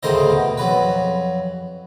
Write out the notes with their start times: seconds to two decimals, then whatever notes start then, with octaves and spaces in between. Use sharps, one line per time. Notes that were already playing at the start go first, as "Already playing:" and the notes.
0.03 D2 A2 C#3 A#4 C5 D#5
0.30 B2
0.57 F2 F#3 B4